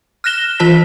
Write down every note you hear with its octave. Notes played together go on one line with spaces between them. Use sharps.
F6 F#6 A#6 E7 G7
E3 F4 C5 A5 B6